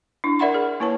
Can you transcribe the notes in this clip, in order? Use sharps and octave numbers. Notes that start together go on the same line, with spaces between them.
D4 E4
A#4 D5 E5 F#5 B5 C6
G#4
A#3 E4 B4 C#5 A5